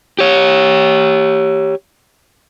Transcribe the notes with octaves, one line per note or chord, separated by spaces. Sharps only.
G4 C#5